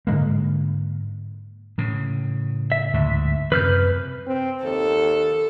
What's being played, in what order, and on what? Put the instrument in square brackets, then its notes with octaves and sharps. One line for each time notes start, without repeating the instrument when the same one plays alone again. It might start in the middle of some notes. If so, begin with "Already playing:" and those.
[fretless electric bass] G#2 D3 G#3 A#3
[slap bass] A2 C#3
[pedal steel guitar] E5
[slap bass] D2 G#2
[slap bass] F#2 C3 [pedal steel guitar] B4 F6 G6
[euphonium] C4
[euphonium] D#2 [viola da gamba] A4